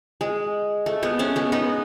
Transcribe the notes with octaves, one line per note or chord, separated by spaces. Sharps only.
G#3
A3
G#3 B3
A3 C#4
G#3 B3
B3 D#4